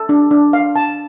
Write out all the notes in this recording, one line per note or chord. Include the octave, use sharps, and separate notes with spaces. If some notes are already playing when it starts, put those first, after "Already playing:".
Already playing: A4
D4
D4
F5
A5